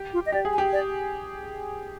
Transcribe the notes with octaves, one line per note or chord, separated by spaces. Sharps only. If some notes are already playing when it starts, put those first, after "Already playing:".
Already playing: G4
F4
D#5
G4 D5
G#4
G#5
G4
D5